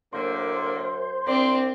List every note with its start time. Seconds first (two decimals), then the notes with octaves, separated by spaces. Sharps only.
0.13 F#2 A2 D3 A#3 C5
1.27 C2 C4 D4 C5 D5